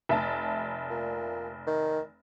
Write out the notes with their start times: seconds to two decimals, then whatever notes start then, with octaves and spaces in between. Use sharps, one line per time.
0.09 F1 E5 A5
0.90 A#2
1.66 D#3